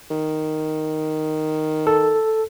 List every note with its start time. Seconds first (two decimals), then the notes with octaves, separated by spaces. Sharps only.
0.11 D#3
1.87 A4